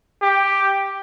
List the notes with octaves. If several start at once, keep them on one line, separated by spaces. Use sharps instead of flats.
G4